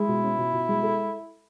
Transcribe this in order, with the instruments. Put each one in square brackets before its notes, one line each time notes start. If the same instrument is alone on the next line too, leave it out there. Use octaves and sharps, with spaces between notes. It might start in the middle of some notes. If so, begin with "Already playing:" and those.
Already playing: [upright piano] G#3 [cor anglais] E4
[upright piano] B2
C#4
B2
B2
G#3
A4